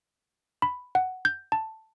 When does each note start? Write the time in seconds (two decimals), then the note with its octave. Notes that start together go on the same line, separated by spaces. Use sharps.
0.62 B5
0.95 F#5
1.25 G6
1.52 A5